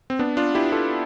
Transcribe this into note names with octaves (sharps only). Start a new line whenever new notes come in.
C4
B3 D4
D4 F4
E4 G4
F4 A4